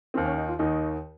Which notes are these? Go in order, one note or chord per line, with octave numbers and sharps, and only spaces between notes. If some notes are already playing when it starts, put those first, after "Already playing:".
D#2 D#3 C4
C#4
D#4
F4
D#2 D#3 D#4